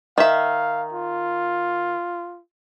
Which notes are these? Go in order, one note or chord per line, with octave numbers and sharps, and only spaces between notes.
D#3 E5 F5
F4